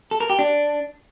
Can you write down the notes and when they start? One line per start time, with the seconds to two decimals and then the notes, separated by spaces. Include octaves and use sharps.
0.11 A4
0.20 A#4
0.30 G4
0.39 D4